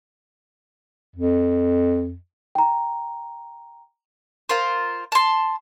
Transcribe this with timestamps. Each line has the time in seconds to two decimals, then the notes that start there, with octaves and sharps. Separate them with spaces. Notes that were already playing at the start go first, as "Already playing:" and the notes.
1.16 F2
2.55 G5 A#5
4.49 F4 A#4 C5
5.12 A5 C6